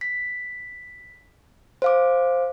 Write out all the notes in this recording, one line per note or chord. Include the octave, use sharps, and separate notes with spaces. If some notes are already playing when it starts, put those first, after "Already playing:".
B6
C5 F5 D6